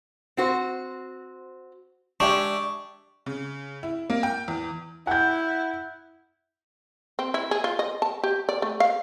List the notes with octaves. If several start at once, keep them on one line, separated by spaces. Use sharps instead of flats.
C4 F#4 C5
G#3 D4 G4 E5 C#6
C#3
E4
A#3
G5
E2
E4 F#5 G6
C4
E4
G#4
F4
D#5
A5
G4
D5
A3
F5